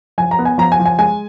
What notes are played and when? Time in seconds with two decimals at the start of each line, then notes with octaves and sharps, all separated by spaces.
0.18 F3 G#5
0.31 A#5
0.39 B3
0.45 G#5
0.58 F3 A#5
0.72 G#5
0.79 F3
0.86 G#5
0.99 G#3 G#5